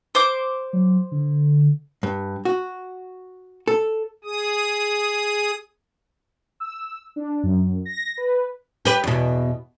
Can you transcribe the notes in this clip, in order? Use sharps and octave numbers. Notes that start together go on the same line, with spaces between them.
C5 D6
F#3
D3
G2
F#4
A4
G#4 D#6
E6
D4
F#2
A#6
B4
G4 B4
E2 B2